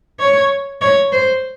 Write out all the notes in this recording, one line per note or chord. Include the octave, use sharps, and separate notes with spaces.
C#5
C#5
C5